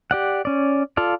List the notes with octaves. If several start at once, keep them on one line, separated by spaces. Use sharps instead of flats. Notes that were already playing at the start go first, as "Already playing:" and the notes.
G4 D5 F#5
C#4 D5
F4 A4 D5 F5